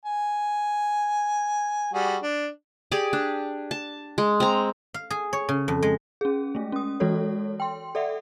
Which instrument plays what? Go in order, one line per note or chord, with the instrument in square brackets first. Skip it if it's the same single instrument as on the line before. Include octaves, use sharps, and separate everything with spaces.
[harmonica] G#5
G3 F#4 G#4
D4
[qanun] G4 G#4 D5
D4
A5
G#3
C4 A#5
[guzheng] F5
G#4
C#5
C#3
F2
G#3
[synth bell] C#4 G#4
G#3 A3
C#4 D#6
E3 G#3 F#4 A4 C#5
G5 C6
A4 D5 E5 F#5